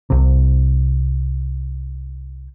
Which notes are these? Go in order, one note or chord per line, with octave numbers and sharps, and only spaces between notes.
C2 C3